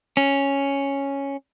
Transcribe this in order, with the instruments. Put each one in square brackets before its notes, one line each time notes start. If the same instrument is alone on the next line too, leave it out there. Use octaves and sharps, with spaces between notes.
[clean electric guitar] C#4